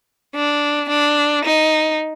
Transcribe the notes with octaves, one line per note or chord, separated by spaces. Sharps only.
D4
D4
D#4